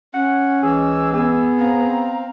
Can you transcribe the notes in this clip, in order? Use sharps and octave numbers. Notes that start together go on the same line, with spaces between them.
C#4 F#5
C#2 E3 G#4 E6
B3 G#4
C4 F5 A#5